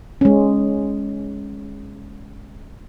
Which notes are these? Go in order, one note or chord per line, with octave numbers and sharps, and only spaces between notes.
G#3 C#4